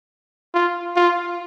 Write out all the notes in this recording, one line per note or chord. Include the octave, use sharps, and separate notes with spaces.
F4
F4